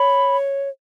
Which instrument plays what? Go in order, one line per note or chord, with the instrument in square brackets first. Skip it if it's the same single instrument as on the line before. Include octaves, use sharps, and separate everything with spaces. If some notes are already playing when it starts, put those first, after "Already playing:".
Already playing: [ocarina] C#5 [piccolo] B5